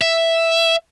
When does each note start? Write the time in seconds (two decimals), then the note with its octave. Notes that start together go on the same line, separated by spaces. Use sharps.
0.01 E5